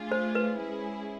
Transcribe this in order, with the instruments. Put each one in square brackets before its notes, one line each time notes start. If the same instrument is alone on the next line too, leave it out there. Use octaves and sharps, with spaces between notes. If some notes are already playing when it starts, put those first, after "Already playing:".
Already playing: [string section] A3 D4 F4 G#4
[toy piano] C5
B4
[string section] G#3 C#4 E4 G#4